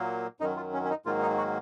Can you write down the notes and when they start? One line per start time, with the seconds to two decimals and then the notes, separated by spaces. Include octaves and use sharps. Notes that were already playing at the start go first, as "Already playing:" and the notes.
Already playing: A#2 F#3 A#3
0.40 F#2 D#3 F#3 D#4
0.56 F4
0.74 C#4
0.85 C#4
0.90 D#4
1.06 G#2 D#3 F#3 A#3 F4
1.22 D#4
1.38 F#4